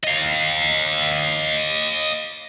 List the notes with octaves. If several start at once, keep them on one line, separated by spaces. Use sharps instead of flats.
D#5 F5